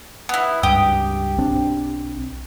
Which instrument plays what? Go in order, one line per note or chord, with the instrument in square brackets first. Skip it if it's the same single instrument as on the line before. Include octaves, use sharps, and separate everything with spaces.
[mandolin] B3 E4
[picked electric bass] C#2 G2 [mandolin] G4 G5 D#6
[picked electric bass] B1 C4 D4